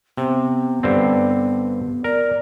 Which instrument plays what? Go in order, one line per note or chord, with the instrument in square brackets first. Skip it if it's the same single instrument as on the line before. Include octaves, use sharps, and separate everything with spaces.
[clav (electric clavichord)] C3 [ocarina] B3
[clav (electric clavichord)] G2 D3 C4
[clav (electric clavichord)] A#4 [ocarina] D5